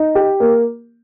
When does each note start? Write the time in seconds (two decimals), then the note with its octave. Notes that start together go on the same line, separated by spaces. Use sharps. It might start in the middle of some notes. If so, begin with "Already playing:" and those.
Already playing: D#4
0.15 G4
0.40 A#3